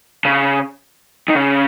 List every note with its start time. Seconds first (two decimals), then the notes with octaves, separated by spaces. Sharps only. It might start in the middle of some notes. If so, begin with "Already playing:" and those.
0.25 C#3
1.28 D#3
1.34 C#3